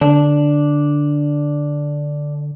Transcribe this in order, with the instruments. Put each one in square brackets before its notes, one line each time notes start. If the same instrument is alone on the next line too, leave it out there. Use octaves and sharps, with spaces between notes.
[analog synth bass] D3 [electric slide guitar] D4